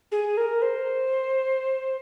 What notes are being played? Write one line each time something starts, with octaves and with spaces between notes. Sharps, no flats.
G#4
A#4
C5